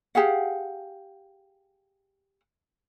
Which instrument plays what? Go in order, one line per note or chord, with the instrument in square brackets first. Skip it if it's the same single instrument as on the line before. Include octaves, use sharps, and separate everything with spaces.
[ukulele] G4 G#4 F5 F#5